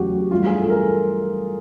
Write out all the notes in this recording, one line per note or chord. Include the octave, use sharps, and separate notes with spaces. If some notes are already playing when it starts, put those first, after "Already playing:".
Already playing: E2 C#3 F#3 A3 F#4 G4
G2 E3 A3 F4
G#4
A4
A#4